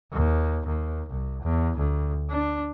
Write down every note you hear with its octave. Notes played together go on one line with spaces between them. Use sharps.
D#2
D#2
C2
E2
D2
D4